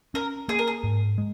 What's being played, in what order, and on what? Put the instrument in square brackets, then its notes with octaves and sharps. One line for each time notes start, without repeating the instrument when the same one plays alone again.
[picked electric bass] C#4 [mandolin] A#4
[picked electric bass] A#3 [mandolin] G#4
[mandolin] A#4
G#4
[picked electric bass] G#2
G#3